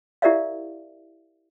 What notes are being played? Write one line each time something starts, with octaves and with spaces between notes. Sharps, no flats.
E4 G4 A#4 D5 E5 F5